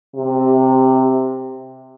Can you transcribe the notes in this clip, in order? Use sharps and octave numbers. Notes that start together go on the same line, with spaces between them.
C3